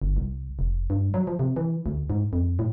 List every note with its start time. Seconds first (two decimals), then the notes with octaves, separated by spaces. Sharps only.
0.02 G1
0.17 C2
0.59 F1
0.90 G2
1.14 F#3
1.27 F3
1.39 C3
1.56 E3
1.86 D2
2.10 G#2
2.33 F2
2.59 A2